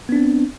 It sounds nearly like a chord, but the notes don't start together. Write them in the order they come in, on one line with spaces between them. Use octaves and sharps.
B3 D4 C4